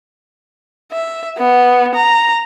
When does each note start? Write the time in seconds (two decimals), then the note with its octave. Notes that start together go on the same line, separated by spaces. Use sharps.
0.92 E5
1.38 B3
1.95 A#5